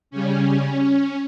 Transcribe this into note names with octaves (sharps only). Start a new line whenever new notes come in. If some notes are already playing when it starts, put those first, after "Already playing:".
C#3 G3 C#4